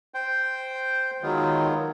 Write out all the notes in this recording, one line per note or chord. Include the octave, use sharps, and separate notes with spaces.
C5 G5
D#3 F#3 G#3 B3 F4